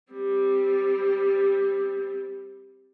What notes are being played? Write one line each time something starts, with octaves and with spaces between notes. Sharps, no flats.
G3 C4